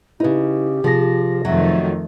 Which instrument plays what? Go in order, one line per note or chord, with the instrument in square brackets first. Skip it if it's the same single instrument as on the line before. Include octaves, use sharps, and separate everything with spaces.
[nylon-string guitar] C#3 D#4 [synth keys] E4 B4 [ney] G4
[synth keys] C3 G#4 A#6 [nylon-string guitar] F3 F4
[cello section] F2 D#3 A3 [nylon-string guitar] F#3 F#4 [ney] E5